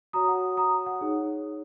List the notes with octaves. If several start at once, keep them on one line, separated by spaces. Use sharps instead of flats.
F#4 C#5 A#5 D#6
F#5
A#5 D#6
F#5
D#4 G#4 C#5